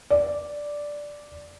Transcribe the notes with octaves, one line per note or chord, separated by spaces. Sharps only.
D5